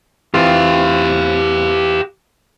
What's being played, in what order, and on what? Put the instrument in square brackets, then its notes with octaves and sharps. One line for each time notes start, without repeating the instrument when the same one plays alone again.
[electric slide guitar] E3 C4 F4 [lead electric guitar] G4 F5